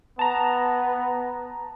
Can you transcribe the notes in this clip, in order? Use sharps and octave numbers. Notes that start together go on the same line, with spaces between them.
B3 A5 A#5